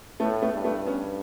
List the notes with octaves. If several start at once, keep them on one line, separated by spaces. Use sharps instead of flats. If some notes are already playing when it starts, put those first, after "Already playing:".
A2 A3 B3
A3 B3
G2
A3 B3
B3 C#4